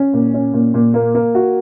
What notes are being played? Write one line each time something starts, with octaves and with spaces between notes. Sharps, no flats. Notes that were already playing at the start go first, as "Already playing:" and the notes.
Already playing: C#4
A#2
C#4
A#2
A#2
A#3
A#3
F#4